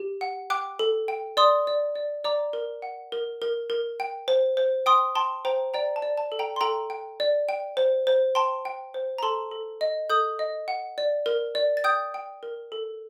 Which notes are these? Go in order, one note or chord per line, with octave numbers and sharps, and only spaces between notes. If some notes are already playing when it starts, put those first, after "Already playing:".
Already playing: G4
F#5
G5 D6 F#6
A4
G5
D5 C6 D#6
D5
D5
D5 A#5 D6
A#4
F#5
A#4
A#4
A#4
G5
C5
C5
G5 C6 D#6
G5 A5 C6
C5 G5 A#5
D5 G5 A#5
A5
D5
A5
A4
G5 A#5
C6
A4 G5 A#5
G5
D5
G5
C5
C5
G5 A5 C6
G5
C5
A#5
A4 A5 C6
A4
D#5
A4 D#6 G6
D#5
F#5
D5
A#4
D5
A6
G5 D#6 G6
G5
A#4
A4